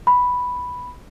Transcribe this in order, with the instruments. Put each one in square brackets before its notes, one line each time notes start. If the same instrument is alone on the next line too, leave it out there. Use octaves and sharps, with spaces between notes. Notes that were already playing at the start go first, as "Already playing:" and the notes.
[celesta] B5